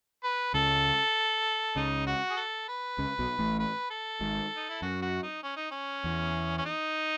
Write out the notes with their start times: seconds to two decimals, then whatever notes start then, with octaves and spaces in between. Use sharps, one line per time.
0.24 B4
0.54 C#2 C#3 A4
1.76 C#2 C#3 D#4
2.07 F#4
2.30 G#4
2.37 A4
2.68 B4
2.98 C#2 C#3
3.19 B1 B2
3.39 A1 A2
3.59 B4
3.91 A4
4.21 G#1 G#2
4.57 D#4
4.69 E4
4.82 F#2 F#4
5.02 F#4
5.23 D#4
5.43 C#4
5.56 D#4
5.71 C#4
6.04 E2
6.58 C#4
6.65 D#4